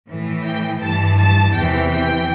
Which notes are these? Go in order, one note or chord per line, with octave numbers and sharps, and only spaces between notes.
A2 E3
G5
G2 E3 A5
A5
E2 C3 E3 G5
G5